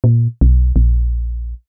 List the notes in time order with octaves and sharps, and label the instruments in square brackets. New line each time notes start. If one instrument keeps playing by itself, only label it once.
[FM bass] A#2
B1
A#1